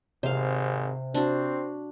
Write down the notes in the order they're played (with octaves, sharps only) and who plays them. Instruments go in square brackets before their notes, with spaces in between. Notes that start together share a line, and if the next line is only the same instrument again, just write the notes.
[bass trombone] G#1 [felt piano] C3 [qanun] C5 F5
[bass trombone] C4 [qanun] D4 F#4